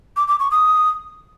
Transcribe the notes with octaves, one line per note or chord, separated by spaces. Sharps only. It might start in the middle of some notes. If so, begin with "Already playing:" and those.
D6
D6
C#6
D#6